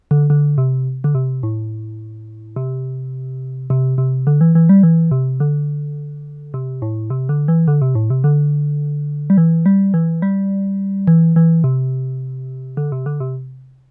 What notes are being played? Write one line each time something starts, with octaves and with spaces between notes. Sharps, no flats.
D3
D3
C3
D3
C3
A2
C3
C3
C3
D3
E3
E3
G3
E3
C3
D3
C3
A2
C3
D3
E3
D3
C3
A2
C3
D3
G3
E3
G3
E3
G3
E3
E3
C3
D3
C3
D3
C3